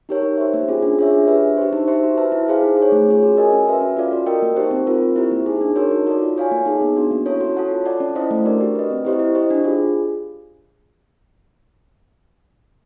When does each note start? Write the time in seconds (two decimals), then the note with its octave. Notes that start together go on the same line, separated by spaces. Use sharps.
0.09 D#4 G4 A#4 C#5
0.23 D#4
0.38 G4 C5 E5
0.54 A#3
0.68 C#4 F4 G#4
0.82 D4
0.99 F4 G#4 C#5 E5
1.13 D4
1.28 G4 B4 E5
1.43 D4
1.57 G4 C5
1.73 D#4
1.87 G4 C5 E5
2.03 F#4
2.18 B4 E5 A5
2.32 E4
2.48 G#4 C5 F5
2.63 D#4
2.77 G#4
2.82 C#5
2.92 A3
3.08 C#4 F4 G#4 C#5
3.22 F#4
3.37 A#4 D#5 G#5
3.53 C#4
3.67 F#4 B4 E5
3.81 C#4
3.97 F4 A4 D5 F5
4.12 F#4
4.26 A#4 D#5 G5
4.42 A#3
4.56 D#4 G4 C5
4.71 C4
4.87 F4 A#4
5.02 C4
5.16 E4 G4 C5
5.31 A#3
5.46 D#4 G#4
5.61 D4
5.76 F#4 A#4 C#5
5.91 D#4
6.07 F#4 A4 D5
6.22 F4
6.37 A4 C#5 F5 G#5
6.52 A#3
6.66 D#4 G#4
6.82 B3
6.96 D4 F#4
7.11 A#3
7.26 C#4 E4 A4 C#5
7.41 F#4
7.56 A4 C#5 F#5 A5
7.71 F4
7.85 A4 D5 F#5 A5
8.00 C#4
8.16 E4 A4 C5 D#5
8.31 A3
8.45 D4 F#4 A#4 D5
8.61 G4
8.75 B4 D#5
8.90 C4
9.05 E4 G4 C5 D#5
9.19 E4
9.35 G4 C5 D#5
9.50 D4
9.64 F4 G#4